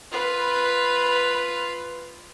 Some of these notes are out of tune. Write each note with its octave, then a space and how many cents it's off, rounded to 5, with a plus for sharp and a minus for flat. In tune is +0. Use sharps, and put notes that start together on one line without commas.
F4 +0 B4 +0